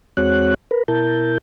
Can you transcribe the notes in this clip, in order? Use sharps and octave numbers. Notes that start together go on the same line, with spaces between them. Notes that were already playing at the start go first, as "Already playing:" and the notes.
E2 G#3 C4 F#4 C#5 F#6
A#4 B4
B2 E4 A#4 A5 G6